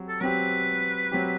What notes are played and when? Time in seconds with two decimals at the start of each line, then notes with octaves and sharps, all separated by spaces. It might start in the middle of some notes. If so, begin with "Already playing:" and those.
Already playing: F#3 C4 G4
0.09 A4
0.21 F#3 C4 G4 B4
1.12 F#3 C4 G4